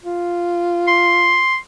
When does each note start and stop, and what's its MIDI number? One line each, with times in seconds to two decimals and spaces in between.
0.03 1.43 65
0.88 1.57 84